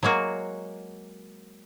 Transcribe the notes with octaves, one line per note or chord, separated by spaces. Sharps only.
F#3 G#3 A#3 F#4